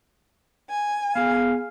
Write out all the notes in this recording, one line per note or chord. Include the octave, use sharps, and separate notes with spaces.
G#5
B3 G#4 F5